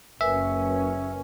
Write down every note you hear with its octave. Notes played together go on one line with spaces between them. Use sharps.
F#1 C#4 A#4 B4 E5 G#5